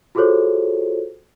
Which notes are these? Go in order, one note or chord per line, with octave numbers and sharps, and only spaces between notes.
F4 F#4 G#4 A4 C5 C#5